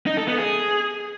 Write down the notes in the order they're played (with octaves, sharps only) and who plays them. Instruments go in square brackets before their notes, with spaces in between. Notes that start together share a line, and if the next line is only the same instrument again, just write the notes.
[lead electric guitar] D#4
A4
B3
G#4